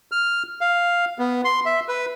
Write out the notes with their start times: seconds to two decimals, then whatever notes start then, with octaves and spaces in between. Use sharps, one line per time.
0.12 F6
0.61 F5
1.19 B3
1.45 C6
1.65 E5
1.88 B4